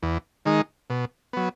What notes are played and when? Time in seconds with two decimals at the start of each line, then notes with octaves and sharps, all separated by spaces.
0.03 E2
0.45 D#3 G#3 D#4
0.90 B2
1.33 F#3 B3